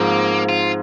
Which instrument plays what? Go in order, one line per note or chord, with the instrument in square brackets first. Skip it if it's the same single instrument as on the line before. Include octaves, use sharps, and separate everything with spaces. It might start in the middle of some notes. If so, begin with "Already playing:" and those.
Already playing: [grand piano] G#2 F3 C4 [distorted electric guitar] A#3
[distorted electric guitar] F4